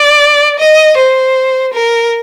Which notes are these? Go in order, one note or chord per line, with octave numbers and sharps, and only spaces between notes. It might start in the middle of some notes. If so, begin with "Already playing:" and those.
Already playing: D5
D#5
C5
A#4